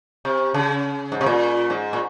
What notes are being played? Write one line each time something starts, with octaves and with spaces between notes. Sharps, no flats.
C3
C#3
G#2
C3
A#2
G#2
A#2